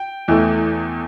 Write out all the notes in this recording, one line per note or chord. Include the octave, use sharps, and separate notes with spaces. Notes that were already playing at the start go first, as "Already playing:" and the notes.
Already playing: G5
E2 E3 A3